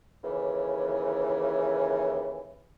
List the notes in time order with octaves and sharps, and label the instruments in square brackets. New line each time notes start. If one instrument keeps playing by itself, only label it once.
[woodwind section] D#2 C#3 E3